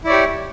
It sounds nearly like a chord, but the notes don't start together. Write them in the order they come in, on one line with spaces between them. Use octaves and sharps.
E4 D5 C#5 G4